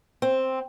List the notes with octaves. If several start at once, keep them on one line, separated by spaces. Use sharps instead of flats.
C4